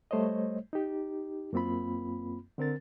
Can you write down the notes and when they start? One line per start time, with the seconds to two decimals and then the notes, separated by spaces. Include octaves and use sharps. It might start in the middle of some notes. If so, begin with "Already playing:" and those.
0.11 G3 A3 C5 C#5 D#5
0.73 D#4 G4
1.53 F#2 A#3 C4 F4 B5
2.58 D3 C4 A#4 A6